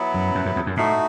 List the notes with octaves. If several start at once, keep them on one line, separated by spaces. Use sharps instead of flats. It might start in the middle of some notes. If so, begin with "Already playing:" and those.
Already playing: F#3 B3 E4
F#2
F#2
F#2
E2
F#2
A2 A3 D#4 F#4